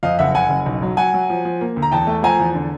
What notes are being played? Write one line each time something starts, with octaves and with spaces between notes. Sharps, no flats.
F2 D#5 F5
F#1 E5 F#5
C#3 F#5 G#5
F#1
B1
F#3
F#3 F#5 G#5
F#3
F3
F3
A#3
D2
A#5
E2 G5 A5
A3
F3 G#5 A#5
E2
D3